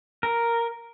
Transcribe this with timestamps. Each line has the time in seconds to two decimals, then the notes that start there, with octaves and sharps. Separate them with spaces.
0.23 A#4